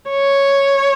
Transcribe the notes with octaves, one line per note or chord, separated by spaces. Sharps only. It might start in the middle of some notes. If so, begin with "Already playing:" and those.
C#5